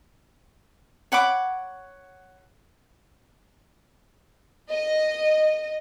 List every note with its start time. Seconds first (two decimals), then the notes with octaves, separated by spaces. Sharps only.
1.12 C#5 F#5 B5 D6
4.70 D#5